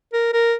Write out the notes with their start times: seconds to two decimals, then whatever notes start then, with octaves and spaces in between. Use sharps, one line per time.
0.13 A#4
0.33 A#4